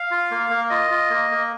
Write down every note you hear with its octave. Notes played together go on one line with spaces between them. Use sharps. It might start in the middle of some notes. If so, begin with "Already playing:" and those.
Already playing: F5
F4
A#3
A#3
F4 D#5
F4
A#3
A#3